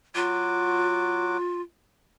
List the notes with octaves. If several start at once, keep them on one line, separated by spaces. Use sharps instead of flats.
F#3 F4 F#4 D6